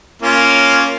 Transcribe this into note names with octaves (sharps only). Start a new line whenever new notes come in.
A#3 C#4 F4